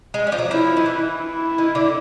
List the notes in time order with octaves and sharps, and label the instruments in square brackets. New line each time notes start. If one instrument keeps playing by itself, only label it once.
[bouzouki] G#3
G3
F3
F#3
[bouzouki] F3 [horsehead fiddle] E4
[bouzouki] D#3
E3
[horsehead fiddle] E4
[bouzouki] D#3
D3